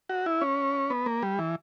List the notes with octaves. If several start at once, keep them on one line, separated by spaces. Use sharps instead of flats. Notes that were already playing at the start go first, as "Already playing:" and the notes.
F#4
E4
C#4
B3
A#3
G3
E3